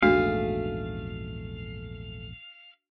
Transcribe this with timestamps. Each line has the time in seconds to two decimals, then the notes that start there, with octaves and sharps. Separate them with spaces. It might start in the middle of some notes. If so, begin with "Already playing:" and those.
0.03 A#1 E2 G#2 A3 D4 F#4 G#4 F5